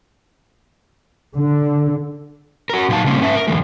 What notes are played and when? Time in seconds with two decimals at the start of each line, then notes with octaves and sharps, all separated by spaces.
1.36 D3
2.70 F#4 A#4
2.89 A#2 F#3 D#4 F5 A5
3.04 C#3 G3 A#3 C4 C#4
3.20 G#2 C#4 B4 E5 A5
3.35 A#4
3.48 F#2 A2 D3 E3 G#3